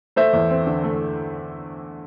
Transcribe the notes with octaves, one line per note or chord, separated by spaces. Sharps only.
A3 C5 E5
E2
C4
D3
A3